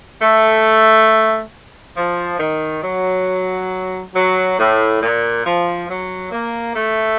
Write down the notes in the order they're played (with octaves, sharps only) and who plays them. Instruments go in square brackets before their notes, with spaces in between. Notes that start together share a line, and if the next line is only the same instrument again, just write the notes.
[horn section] A3
F3
D#3
F#3
F#3
A2
A#2
F3
F#3
A#3
A3